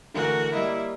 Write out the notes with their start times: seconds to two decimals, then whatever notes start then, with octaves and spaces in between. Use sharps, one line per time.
0.14 D3 E3 A3 F#4 A#4
0.53 G3 A#3 E4 D#5